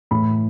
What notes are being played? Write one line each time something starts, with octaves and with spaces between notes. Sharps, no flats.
A2 E3 B5